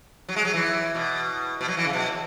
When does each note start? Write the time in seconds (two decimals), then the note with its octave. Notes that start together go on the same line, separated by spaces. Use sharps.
0.29 F#3
0.36 G#3
0.45 F#3
0.54 E3
0.95 B2
1.61 B2
1.68 F#3
1.77 E3
1.85 C#3
1.93 B2